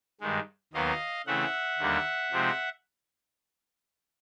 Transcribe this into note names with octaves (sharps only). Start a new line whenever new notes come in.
G2 D#3 G#3
D#2 D#3 F#3 B3 D#5 F5
C#3 E3 A3 C4 E5 F#5
D#2 D3 G3 A#3
C3 F3 G#3 C4 D#4